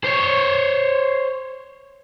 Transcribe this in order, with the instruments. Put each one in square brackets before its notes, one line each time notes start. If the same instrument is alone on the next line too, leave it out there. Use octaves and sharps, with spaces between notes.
[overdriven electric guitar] C5 C#5